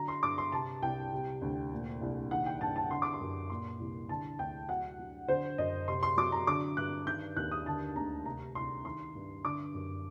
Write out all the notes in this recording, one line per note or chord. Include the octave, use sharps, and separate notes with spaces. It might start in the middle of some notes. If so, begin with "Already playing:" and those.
Already playing: D3 F#3 A#5
C6
G2 D6
C6
C3 A5
C2 G5
C3
D2
A#2
C2
D#3 F#5
G5
G2 A5
A5
D3 C6
D6
C6
F#2
A#2 C6
C2
D3 A5
D2 G5
F#3 F#5
F#3
D3 C5
F#2 D#5
C3 C6
C6
F#3 D6
A#5
D3 D6
G2 F#6
D#3 G6
D#2 F#6
D#6
D3 A5
D2 A#5
C3 A#5
C2 C6
D#3 C6
G2
D3 D6
F#2